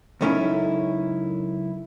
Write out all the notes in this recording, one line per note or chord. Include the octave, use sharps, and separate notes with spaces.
C#2 F#2 A3 C#4 D#4 E4